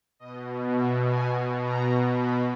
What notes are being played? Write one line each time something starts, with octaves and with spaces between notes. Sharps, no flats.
B2 D#5
E5
G#5
B2
A#5
B5